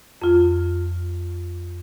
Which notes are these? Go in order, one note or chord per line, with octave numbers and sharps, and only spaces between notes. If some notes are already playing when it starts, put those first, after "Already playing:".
F2 F4